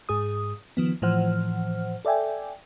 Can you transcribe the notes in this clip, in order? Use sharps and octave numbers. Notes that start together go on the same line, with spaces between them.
G#2 G#4 D#6
D#3 F3 B3
A2 E3 F3 C5 F#5 F6
A4 D5 E5 G5 G#5